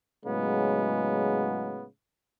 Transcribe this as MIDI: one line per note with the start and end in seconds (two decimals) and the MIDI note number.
0.25 1.86 45
0.25 1.86 49
0.25 1.86 54
0.25 1.86 56
0.25 1.86 59